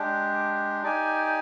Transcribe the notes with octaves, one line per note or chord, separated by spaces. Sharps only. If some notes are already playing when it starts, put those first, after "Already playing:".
Already playing: G#3 D4 G4
D#4 G4 D5 G#5